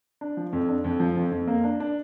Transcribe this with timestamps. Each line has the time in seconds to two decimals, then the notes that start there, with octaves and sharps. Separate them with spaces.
0.21 D4
0.37 F3
0.53 F2
0.68 D4
0.84 F2
1.00 F3
1.16 F2
1.31 F2
1.47 A#3
1.64 D4
1.80 D4